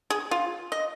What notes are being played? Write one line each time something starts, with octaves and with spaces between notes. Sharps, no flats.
G#4
F4
D#5